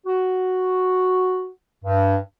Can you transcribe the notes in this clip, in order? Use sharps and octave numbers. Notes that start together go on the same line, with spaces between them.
F#4
G2